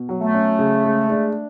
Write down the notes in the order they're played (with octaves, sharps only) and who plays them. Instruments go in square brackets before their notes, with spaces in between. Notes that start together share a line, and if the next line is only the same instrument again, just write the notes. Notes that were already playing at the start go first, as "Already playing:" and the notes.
Already playing: [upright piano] B2
F#3
[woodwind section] A3
[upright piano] C#4
C#3
G#3
D4